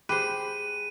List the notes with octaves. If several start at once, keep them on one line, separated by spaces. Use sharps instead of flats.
G4 G#4 C5 B5 F#6 D#7